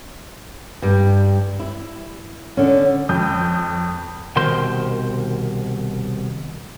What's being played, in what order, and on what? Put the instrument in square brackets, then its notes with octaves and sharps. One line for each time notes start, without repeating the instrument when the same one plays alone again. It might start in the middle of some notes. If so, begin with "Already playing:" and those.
[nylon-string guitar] G2 G3
E4
D3 C#4
[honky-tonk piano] F2 D#6 G6
[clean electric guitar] C2 B2 D#3 A#4 C5 C6